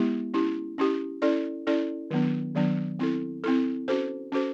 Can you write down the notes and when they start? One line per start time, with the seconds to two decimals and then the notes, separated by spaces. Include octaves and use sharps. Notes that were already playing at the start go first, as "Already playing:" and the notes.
Already playing: G#3 B3 E4 G4
0.34 C#4 E4 G4
0.78 C#4 E4 G4
1.22 C#4 E4 A4 D5
1.67 C#4 E4 A4 D5
2.11 D#3 F#3 B3 D4
2.55 D#3 F#3 B3 D4
2.99 C4 E4 A4
3.44 C4 E4 A4
3.88 C#4 F#4 A4 C5
4.32 C#4 F#4 A4 C5